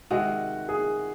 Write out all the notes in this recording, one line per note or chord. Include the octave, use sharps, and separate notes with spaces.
C3 D#3 G#3 F#4
G#4